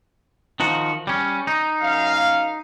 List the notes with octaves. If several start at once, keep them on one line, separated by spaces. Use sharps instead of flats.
D#3 F3 F#4
G3 C#4
D#4
F#2 F5